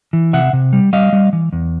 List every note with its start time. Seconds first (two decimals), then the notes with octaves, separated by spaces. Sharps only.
0.13 E3
0.33 C3 E5 F#5
0.53 C3
0.73 G3
0.93 G3 D#5 F5
1.13 G3
1.33 E3
1.53 E2